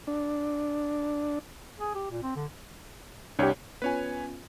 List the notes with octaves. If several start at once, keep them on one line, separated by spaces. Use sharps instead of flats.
D4
G#4
G4
A#2
C4
D3
C2 D4 G4 C#5
B3 C#4 F4 B4 C#5 G#5